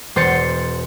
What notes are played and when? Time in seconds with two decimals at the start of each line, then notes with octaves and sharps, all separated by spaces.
0.16 E1 C5 C6 A6 C#7